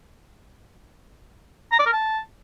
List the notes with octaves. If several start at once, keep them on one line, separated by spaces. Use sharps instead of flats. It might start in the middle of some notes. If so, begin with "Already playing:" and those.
A#5
D5
A#4
A5